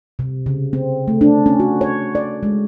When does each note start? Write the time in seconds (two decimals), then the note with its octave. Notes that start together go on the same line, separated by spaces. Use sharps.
0.19 C3
0.46 C#3
0.73 C4
1.08 A3
1.21 D4
1.46 C#4
1.60 F#4
1.81 C#5
2.15 D5
2.43 G#3